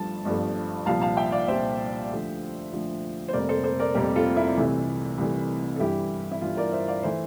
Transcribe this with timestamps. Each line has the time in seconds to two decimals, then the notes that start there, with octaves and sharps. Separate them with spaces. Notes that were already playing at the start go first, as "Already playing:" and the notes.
Already playing: G1 G2 F3 A3 A5
0.25 G1 G2 F3 A3
0.86 C2 A#2 F3 F5 A5
1.01 F5 A5
1.17 E5 G5
1.32 D5 F5
1.48 C2 A#2 F3 C5 E5
2.10 D2 D3 F3
2.72 D2 D3 F3
3.28 C5
3.33 F1 F2 C3 G3 A#3 A#4 D5
3.49 A4 C5
3.64 A4 C5
3.80 A#4 D5
3.94 F1 F2 C3 G3 A#3 G4 A#4
4.16 F4 A4
4.37 E4
4.57 C2 C3 E3 A3
5.18 C2 C3 E3 A3
5.76 A4
5.80 G1 G2 E3 E4 G4
6.31 E4
6.41 G1 G2 E3 F4
6.57 A#4 D5
6.73 C5 E5
6.88 D5 F5
7.03 E3 A3 C5 E5